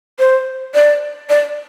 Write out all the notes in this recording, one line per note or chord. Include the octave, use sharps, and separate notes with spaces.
C5
D5
D5